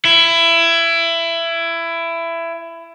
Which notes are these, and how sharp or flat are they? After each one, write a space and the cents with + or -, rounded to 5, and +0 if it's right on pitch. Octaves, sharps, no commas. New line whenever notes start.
E4 +20